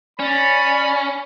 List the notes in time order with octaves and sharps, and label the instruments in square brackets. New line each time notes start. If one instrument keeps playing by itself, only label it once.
[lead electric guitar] C#4 [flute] D5 [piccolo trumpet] B5